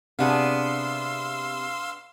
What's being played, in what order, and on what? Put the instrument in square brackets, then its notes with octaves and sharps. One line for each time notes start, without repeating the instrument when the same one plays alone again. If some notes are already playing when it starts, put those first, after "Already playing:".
[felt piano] C3 [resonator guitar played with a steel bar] B3 D4 G#4 [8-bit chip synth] F5 C6 E6